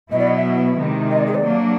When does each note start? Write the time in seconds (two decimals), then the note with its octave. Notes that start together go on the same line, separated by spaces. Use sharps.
0.11 B2 F#3 B3 E4 D#5
0.19 D5
0.27 D#5
0.37 E5
0.77 C3 D#3 G#3
1.10 D#5
1.19 D5
1.26 G#4
1.34 D5
1.43 F#3 A#3 D4